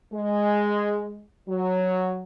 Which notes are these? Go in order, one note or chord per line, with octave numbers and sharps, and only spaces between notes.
G#3
F#3